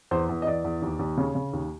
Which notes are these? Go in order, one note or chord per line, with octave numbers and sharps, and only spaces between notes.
E2 C5
E2
D#5
E2 D5
E2
D#2
D#2
C#3
C#3
D#2